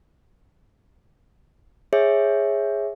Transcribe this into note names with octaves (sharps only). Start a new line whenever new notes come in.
G#4 C#5 E5